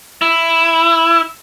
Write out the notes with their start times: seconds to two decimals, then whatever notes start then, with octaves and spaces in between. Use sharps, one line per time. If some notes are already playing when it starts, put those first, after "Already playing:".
0.22 E4